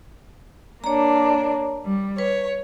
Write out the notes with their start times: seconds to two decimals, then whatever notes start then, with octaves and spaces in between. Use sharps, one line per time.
0.84 A#3 D4 C#5 A#5
1.85 G3
2.18 B4 C#5